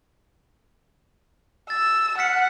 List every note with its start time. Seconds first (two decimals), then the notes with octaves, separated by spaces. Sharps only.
1.70 E6 A6
2.18 F#5 F6 B6 C#7